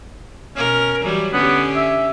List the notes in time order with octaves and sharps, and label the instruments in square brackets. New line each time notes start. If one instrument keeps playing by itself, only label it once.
[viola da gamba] B2 A#4 [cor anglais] C#4
[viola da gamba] E3 F#3 G3
[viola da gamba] D3 C#4 G4 [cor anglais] B3
[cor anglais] E5